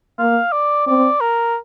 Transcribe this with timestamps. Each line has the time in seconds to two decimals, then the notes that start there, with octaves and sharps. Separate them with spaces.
0.19 A#3 F5
0.52 D5
0.86 C4 D5
1.21 A#4